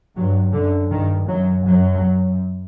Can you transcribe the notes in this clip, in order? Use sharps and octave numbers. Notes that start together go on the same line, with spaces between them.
G2 F#3
F#2 D3
G2 D#3
F#2 F#3
F#2 F#3
F#2